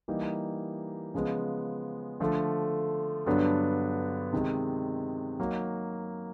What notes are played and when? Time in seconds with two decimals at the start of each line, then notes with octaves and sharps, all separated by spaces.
0.08 E3 G3 A#3 D#4
1.14 C#3 F3 G#3 B3
2.20 D3 F3 A3
3.26 G2 D3 F#3 B3 D4
4.33 C3 D#3 G#3
5.40 F#3 A#3 D#4 F#4